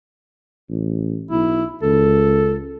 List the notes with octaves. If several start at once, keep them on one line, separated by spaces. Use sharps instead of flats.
A1
B1 E4
C#2 A4